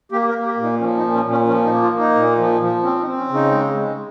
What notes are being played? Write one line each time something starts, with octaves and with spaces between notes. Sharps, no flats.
A#3 G4
A#4
A#3
G4
A#2
D#4
F3 C#4
D#4
A#2
C#4
A#2
C#4
F3 C#4
D#4
A#3
F4
A#3
D#4
A#2
F3
F3
C4 C#4
D#4
C4
C#4
C#3 D#4
G#3
G#3